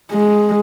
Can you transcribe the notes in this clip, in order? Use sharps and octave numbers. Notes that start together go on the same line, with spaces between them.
G#3